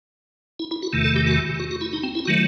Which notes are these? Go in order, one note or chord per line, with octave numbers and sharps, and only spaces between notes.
E4
E4
F#4
E2 C3 D#3 A3
A4
G4
F#4
F#4
F#4
E4
D#4
C4
E4
D#3 F#3 A3 F#4